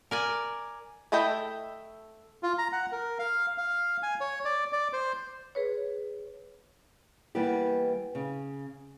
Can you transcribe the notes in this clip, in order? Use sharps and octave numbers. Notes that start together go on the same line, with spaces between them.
A#4 D5 G#5
A3 E4 A4 D#5 G5
F4
A#5
F#5
A#4
F5
F5
G#5
C#5
D5
D5
C5
G#4 B4 C#5
E3 G3 A#3 B3 G4
C#3